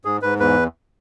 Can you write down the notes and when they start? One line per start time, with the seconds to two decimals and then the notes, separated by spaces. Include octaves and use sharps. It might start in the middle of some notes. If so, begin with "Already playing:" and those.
0.05 G#2 G#4
0.22 G#2 B4
0.40 E2 B4